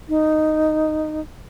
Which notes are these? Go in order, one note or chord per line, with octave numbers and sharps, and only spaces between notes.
D#4